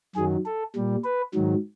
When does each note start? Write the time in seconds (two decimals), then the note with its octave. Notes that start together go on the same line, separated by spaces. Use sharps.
0.16 F#2 D#3 F#3 G#4
0.46 A4
0.76 A#2 G3
1.04 B4
1.34 G#2 D#3 F#3